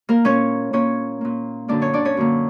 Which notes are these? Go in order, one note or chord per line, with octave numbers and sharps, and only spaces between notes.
A#3 A#4
A#2 A#3 C#4 C#5
A#2 A#3 C#4 C#5
A#2 A#3
F#2 D3 A#3 D4 D5
C#4 C#5
D4 D5
C#4 C#5
F#2 D3 A#3